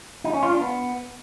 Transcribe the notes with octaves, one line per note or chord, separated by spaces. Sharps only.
D#4
C#4
F4
D4
B3